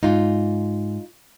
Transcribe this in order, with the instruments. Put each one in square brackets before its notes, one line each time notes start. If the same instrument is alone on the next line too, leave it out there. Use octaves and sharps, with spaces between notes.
[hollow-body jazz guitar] G#2 [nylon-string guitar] D#4 F4